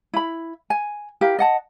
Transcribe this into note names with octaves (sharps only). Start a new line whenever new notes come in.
E4 B5
G#5
E4 G4 A#4 F5
D#5 F#5 A5